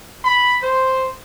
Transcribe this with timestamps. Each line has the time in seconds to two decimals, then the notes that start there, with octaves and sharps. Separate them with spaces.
0.24 B5
0.63 C5